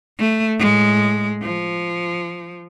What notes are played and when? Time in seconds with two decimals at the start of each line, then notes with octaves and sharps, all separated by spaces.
0.18 A3
0.59 A2 G#3
1.42 F3